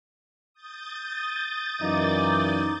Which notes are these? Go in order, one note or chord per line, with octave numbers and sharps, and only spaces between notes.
D#6 G6 A6
F#2 E3 A#3 D#4 D5